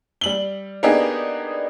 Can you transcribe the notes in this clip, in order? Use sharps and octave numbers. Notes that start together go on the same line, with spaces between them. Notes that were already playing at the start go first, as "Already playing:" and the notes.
G3 F#7 G7
A#3 B3 D4 D#4 G4 G#4